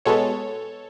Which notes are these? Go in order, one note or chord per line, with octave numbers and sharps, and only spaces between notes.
B2 G#3 B3 A4 C#5